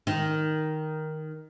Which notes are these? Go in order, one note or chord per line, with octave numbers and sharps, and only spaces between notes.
D#3